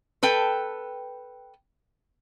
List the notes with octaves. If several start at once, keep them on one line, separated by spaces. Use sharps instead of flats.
A4 B4 G5